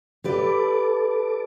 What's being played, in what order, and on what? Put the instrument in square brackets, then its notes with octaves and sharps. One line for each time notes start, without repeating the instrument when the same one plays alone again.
[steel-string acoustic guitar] G4 B4 D5 [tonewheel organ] A4 D6